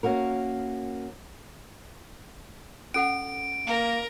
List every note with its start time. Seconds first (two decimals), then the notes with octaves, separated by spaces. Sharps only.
0.03 A#3 C#4 F#4 A#4
2.94 C#4 A4 F#5 D7
3.67 A#3 A#4